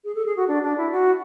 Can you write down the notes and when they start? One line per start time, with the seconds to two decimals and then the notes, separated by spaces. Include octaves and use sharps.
0.04 G#4
0.15 A4
0.26 G#4
0.36 F#4
0.48 D4
0.63 D4
0.77 E4
0.92 F#4